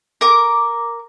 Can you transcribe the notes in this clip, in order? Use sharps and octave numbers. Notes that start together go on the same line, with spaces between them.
A#4 D6